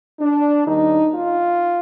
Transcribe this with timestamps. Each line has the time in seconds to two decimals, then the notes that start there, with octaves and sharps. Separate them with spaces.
0.20 D4
0.66 D#2 D#3 G3 D#4
1.12 F4